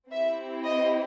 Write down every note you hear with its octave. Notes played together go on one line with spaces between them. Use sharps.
C4 E4 G4 E5
D#5